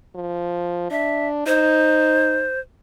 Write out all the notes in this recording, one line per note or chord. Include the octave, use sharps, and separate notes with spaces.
F3
D4 E5
D#4 C5